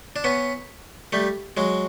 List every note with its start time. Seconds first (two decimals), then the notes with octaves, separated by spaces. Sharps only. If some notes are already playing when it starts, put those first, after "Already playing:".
0.16 D4
0.24 B3 C#4
1.13 G3 A3
1.57 F#3 G#3